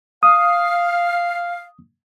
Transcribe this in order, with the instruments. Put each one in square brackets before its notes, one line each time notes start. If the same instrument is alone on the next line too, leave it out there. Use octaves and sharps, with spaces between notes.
[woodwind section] F5 [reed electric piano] D#6